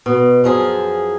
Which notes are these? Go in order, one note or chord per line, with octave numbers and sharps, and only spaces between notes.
B2
F#2 F3 G#4